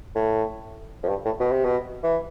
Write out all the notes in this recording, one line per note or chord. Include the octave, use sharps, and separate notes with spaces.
A2
F2
G2
A2
B2
C3
B2
E3